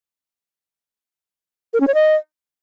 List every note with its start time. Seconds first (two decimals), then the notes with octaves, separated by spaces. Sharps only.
1.74 A#4
1.80 C#4
1.87 C#5
1.94 D#5